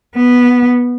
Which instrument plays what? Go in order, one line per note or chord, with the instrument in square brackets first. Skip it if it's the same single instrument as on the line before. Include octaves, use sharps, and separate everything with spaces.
[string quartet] B3